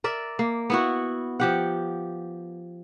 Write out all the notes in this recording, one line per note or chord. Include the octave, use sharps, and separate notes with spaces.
A#4 D5 E5
A#3
B3 E4 F#4
F3 G4 F#5